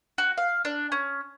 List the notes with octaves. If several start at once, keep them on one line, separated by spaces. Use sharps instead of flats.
F#4
F5
D4
C#4